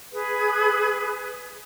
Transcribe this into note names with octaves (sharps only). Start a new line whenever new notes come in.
G#4 B4